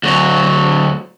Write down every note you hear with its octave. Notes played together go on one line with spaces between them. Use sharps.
D2 F#3